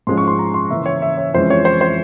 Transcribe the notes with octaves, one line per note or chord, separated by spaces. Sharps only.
G#2 F3 G#3 C#4 C6
C#6
C6
A#5
C6
C#3 E3 A#3 C#4 E5
C#5
E5
C#5
F2 E3 G#3 C#4 C5
C#5
C5
C5